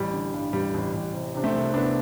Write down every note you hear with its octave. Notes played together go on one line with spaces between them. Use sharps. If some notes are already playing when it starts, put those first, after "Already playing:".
Already playing: A1 G3
D3
G2
A1 G3
A1
A1
C3
C3 D4
A3 C4
C2
C2 B3 D4